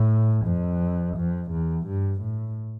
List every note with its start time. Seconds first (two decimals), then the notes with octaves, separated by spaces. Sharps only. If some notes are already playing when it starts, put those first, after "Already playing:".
Already playing: A2
0.46 F2
1.17 F2
1.52 E2
1.87 G2
2.22 A2